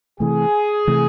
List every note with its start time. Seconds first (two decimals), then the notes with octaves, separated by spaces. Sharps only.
0.20 C3 E3 A3 G#4
0.87 C3 E3 A3